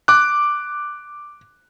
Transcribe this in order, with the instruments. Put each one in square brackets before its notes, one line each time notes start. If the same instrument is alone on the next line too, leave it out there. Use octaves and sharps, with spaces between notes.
[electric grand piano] D6 F#6